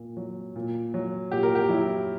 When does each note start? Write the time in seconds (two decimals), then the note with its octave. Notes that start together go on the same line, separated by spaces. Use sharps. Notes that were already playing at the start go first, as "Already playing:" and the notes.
Already playing: A#2
0.17 F#3
0.56 A#2
0.94 F#3
1.32 A#2 G4
1.43 A#4
1.55 G4
1.69 F#3 E4